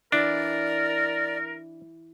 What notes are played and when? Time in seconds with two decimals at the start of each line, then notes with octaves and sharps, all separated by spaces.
0.12 E3 D4 A#4 D5